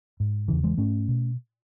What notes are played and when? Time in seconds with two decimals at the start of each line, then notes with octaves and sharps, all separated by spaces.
0.20 G#2
0.48 E2 C#3 E3
0.64 E3 G#3
0.78 G#2 A3 C#4
1.08 B2